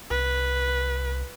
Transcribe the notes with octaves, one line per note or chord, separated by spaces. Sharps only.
C2 B4